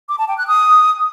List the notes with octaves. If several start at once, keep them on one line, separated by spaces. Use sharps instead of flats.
D6
A5
G5
F#6
D#6